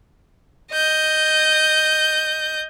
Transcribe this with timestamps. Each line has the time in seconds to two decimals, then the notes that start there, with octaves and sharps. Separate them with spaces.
0.72 D#5 G6